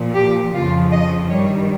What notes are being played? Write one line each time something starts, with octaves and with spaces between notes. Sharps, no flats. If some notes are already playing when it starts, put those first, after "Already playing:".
Already playing: A#2 F3
G4
F2 C#3 F3 F4
D#5
G2 D#3 G3 C#5